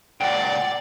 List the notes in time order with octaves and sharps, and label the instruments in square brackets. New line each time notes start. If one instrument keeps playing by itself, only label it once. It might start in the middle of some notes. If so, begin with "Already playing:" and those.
[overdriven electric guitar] C#2 A#2 [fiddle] D5 [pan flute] F#5 [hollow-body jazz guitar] G5